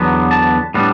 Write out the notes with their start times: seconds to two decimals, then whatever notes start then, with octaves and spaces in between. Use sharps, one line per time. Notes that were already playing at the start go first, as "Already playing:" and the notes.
Already playing: E2 D3 F#3 B3
0.31 A5
0.74 A2 G3 B3 D4